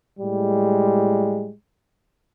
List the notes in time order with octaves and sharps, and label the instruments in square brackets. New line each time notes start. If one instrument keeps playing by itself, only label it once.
[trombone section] A2 G3 G#3